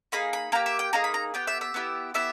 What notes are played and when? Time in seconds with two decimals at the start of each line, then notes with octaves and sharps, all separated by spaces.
0.12 A#3 D#4 G#4 B5
0.33 B5
0.52 A#3 D#4 G4 A#5
0.66 E5
0.79 G5
0.93 A#3 D#4 G#4 A#5
1.04 B5
1.14 A#5
1.34 B3 G4 G5
1.47 E5
1.61 E5
1.74 B3 E4 G4
2.14 B3 E4 G4 E5